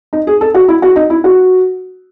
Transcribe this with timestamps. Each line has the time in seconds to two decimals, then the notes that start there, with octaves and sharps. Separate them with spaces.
0.13 D#4
0.27 G#4
0.41 A4
0.54 F#4
0.68 E4
0.82 F#4
0.96 D#4
1.10 E4
1.24 F#4